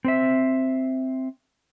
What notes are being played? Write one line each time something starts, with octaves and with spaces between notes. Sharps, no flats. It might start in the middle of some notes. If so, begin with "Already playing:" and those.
C4 C5 E5